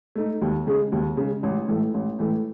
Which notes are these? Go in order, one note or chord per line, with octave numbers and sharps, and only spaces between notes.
A3 D#4
D#2
C#3 G#3
D#2
C#3 G#3
A1
A2 E3 A3
A1
A2 E3 A3